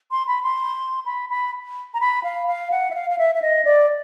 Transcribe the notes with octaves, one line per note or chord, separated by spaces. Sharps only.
C6
B5
C6
B5
B5
A#5
B5
F5
F5
F#5
E5
F5
F5
E5
E5
D#5
D5